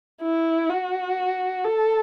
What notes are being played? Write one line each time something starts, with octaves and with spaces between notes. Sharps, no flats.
E4
F#4
A4